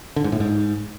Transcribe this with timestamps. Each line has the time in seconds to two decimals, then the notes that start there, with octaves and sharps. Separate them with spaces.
0.16 D3
0.24 G#2
0.32 A2
0.40 G#2